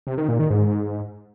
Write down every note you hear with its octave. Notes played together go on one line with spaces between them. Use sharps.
C3
D#3
A#2
D#3
G#2